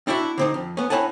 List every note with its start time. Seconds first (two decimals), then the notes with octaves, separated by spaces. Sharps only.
0.07 C4 D4 E4 F#4 E5
0.38 D3 C4 D#4
0.54 F2
0.77 B3 C#4
0.90 C4 E4 C#5 F#5 G#5 A5